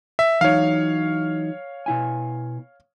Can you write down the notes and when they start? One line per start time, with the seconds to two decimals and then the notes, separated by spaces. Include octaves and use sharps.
0.19 E5
0.41 E3 F#3 D#4 C#5 F5
1.86 B2 E4 G#5